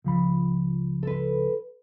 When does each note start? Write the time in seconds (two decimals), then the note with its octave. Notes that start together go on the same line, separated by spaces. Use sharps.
0.04 C#2 F3 B5
1.03 A4 B4